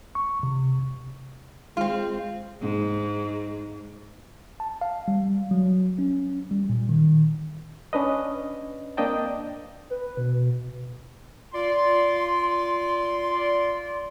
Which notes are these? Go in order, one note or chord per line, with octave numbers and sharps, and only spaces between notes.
C#6
C3
G#3 C4 F4
G#2
A5
F5
G3
F#3
C#4
G3
A#2
D#3
C#4 D4 B4 D#5
A#3 C4 D4 D#5 G5 A5
B4
B2
F4 D5 C6